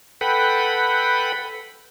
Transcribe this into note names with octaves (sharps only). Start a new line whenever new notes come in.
A4 B4 F#5 G5 B5